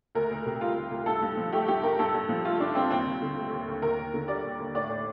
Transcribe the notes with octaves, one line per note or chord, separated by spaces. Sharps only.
D2 A#4
D2
C3
G3 F4
D2
D2
G2 A4
G2
F3
A3 G4
G2 G4
G2 A#4
G2 A4
G2
F3
A3 F4
G2 D4
G2 C4
D#2 C4
D#2
D3
A3
D#2
D#2
D#2 A#4
D#2
D3
G3 D5
D#2
D#2
A2 D5
A2